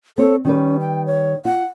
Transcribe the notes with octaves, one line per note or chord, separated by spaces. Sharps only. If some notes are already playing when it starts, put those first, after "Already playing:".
C4 A4 C#5
D#3 G3 C#4 B4
G5
C#5
F4 F#5